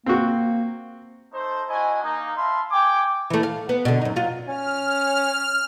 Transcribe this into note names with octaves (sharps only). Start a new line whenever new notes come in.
A#3 C4 F#4
A3 D#4 A4 C5
D4 E4 F#4 D#5 G#5
A#3 D#4
E5 F5 A5 B5 C6
G5 G#5 D6
E3 A3
F5
B3
B2 D3
F#2 D#4
F#3 F4
C#4 F6